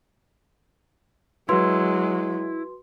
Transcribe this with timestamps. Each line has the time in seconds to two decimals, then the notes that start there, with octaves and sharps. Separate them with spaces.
1.49 F#3 G#3 E4 F#4 B4 C6